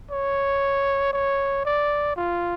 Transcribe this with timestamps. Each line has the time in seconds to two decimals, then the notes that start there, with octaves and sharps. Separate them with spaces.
0.11 C#5
1.13 C#5
1.65 D5
2.16 F4